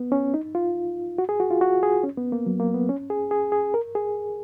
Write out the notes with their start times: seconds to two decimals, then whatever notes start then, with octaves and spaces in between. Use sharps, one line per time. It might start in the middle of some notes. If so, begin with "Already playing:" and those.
Already playing: B3
0.12 C#4
0.34 D#4
0.55 F4
1.18 F#4
1.29 G#4
1.40 F#4
1.51 F4
1.61 F#4
1.83 G#4
2.03 C#4
2.17 B3
2.32 A#3
2.46 F#3
2.60 A#3
2.74 B3
2.89 C#4
3.10 G#4
3.31 G#4
3.52 G#4
3.74 A#4
3.95 G#4